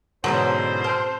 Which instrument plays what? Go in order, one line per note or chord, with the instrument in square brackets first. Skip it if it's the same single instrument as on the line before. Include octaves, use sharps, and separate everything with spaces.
[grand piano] G#2 B2 [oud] D3 E3 C#4 [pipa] F#3 [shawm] C5
[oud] C4 [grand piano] A5 F6